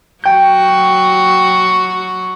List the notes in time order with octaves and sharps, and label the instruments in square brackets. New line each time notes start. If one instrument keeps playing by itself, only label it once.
[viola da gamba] F#3 F#4 [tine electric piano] G5 G6